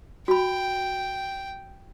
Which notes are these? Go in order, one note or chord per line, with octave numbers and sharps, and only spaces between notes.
F#4 G5 B5